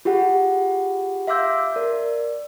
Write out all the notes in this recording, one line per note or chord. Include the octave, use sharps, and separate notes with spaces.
F4 G4 G#4 F#5
E5 F5 C6 D6 E6 G6
A#4 D5